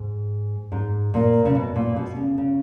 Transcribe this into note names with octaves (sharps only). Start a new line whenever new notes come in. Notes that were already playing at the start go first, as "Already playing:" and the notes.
Already playing: G#2
G#2
A#2
C#3
B2
A#2
B2
C#3
C#3